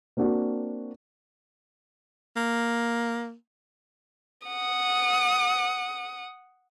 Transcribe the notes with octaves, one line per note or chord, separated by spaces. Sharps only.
A#3 C4 D4 F#4
A#3
F#5 D#6